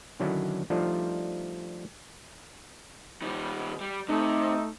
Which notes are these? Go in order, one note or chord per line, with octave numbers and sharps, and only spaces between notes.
D3 D#3 F#3 C#4 D4 E4
F3 G3 A3 D4 D#4 F4
D#3 G3
G3
C3 A3 D#4